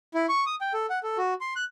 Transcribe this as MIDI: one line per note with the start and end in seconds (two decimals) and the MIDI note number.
0.14 0.26 64
0.29 0.44 85
0.46 0.55 87
0.61 0.73 79
0.74 0.86 69
0.90 0.99 78
1.03 1.17 69
1.18 1.34 66
1.41 1.54 84
1.56 1.64 90